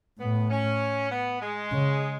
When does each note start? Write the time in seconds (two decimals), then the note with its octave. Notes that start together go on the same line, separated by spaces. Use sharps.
0.20 A2 B3
0.50 C#4
1.11 B3
1.41 G#3
1.71 C#3